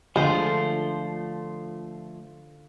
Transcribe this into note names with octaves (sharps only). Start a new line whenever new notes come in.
D3 F3 G#3 A3 F4 C5